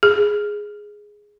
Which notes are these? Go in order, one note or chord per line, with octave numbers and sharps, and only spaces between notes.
G#4